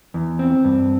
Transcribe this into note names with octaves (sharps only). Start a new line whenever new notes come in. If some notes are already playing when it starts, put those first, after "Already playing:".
E2
C4
G2